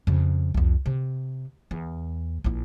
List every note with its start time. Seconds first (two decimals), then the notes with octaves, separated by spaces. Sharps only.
0.07 F2 C#3
0.54 C2 F2
0.86 C3
1.71 E2
2.44 A#1 E4